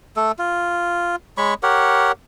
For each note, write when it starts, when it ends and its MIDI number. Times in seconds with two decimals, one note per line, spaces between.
0.16 0.32 57
0.16 0.32 69
0.39 1.16 65
1.38 1.54 56
1.38 1.54 73
1.38 1.54 83
1.38 1.54 85
1.63 2.12 67
1.63 2.12 70
1.63 2.12 73
1.63 2.12 78